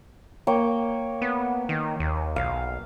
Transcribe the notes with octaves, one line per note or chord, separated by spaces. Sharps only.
A#3 C#5 G5
B3
D#3
D#2
B1 F5